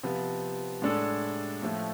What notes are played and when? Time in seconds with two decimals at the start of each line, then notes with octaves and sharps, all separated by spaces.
0.03 C3 F3 B3
0.82 A2 G#3 D4 A4
1.62 A2 F3 A3